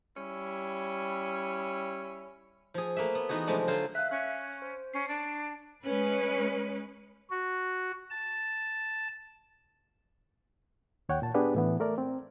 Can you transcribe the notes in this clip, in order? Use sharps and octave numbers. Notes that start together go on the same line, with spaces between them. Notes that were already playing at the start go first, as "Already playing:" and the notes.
G3 C#4 E4
F3 G#4
A3 A#3 B4 E5
B3
E3 B3 D#4 F#4 G#4
C3 F3 G#3 A3 D4
D3 F#3 F4 C5
E5 F5 F#6
C#4 C#6 F#6
C5
C#4 C7
D4
G#3 C#4 B4
F#4
A5
D#2 C#5 F#5 G5
A#2 A5
B3 D4 G4 G#4 B4
A2 E3 B3
A3 A#4 D5
C4